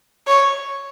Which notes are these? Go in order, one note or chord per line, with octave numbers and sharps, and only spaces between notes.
C#5